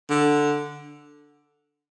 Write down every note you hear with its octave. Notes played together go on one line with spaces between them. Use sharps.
D3